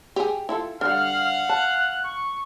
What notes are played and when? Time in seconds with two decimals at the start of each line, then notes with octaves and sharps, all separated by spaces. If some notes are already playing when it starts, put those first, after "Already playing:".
0.16 G4 G#4
0.49 E4 F4 A4
0.81 D3 G3 F5 F#5 F6
1.49 A5 F#6
2.03 C#6